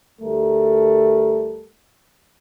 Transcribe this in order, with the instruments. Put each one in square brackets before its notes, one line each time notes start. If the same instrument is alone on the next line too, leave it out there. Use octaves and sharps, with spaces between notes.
[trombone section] D2 G3 A3 A4 A#4